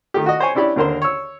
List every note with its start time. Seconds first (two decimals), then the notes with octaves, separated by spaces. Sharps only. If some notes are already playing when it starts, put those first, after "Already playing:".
0.14 D#3 A3 G4
0.26 F#4 D#5
0.40 C5 C#5 G#5
0.55 C#4 D4 E4 G4 D5
0.76 D#2 D3 A#4 C5 C6
1.02 C#5 E6